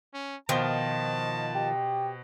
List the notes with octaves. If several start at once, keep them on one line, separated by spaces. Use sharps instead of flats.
C#4
B2 D#3 F3 C5 A5 G7
G4